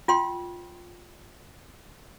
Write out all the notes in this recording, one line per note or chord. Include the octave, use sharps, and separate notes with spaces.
F4 G5 C6